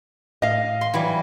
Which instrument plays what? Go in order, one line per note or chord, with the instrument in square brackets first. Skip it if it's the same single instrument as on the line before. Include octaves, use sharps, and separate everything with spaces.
[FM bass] A2 [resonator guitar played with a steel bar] D#5 F5
[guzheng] C6
E3 F#3 G3